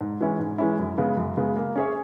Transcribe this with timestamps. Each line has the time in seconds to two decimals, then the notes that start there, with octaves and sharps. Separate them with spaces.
0.01 G#2
0.20 E3 G#3 C#4 E4
0.39 G#2
0.58 E3 G#3 C#4 E4
0.79 F#2
0.98 C#3 G#3 B3
1.17 F#2
1.37 C#3 G#3 B3
1.56 A#3
1.76 C#4 G#4 C#5 E5